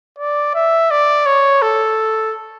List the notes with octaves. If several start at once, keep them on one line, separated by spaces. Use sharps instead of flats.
D5
E5
D5
C#5
A4